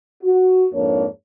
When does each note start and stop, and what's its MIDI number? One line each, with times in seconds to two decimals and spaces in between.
0.23 0.66 66
0.73 1.06 41
0.73 1.06 44
0.73 1.06 58
0.73 1.06 62
0.73 1.06 73